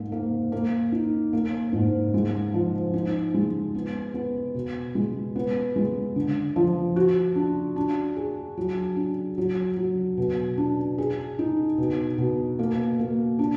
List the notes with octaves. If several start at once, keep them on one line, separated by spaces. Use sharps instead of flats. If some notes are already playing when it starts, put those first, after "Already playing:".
Already playing: G#2 A#3
A#3
A#3
D#4
A#3
G#2
G#3
F3
D#4
G#3
B3
B3
B2
G#3
B3
G#3
D3
F3
F#4
D4
D4
G#4
F#3
D4
F#3
F#3
B2
D4
G#4
D#4
B2
B2
A#3
A#3
D4